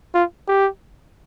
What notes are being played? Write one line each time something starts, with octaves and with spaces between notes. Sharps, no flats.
F4
G4